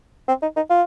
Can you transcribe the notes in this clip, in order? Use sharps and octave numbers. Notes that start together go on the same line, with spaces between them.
C4
D#4
D#4
F4